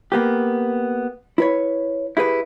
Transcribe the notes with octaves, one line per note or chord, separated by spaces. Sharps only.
A#3 B3 G4
E4 B4 C#5
E4 G4 G#4 B4